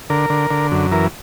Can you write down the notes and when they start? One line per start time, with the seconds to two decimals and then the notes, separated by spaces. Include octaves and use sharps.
0.10 D3 A#4
0.30 D3
0.51 D3
0.71 F#2
0.91 E3 A#4